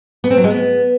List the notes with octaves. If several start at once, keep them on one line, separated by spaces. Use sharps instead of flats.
B3
C4
F#3
G#3
B3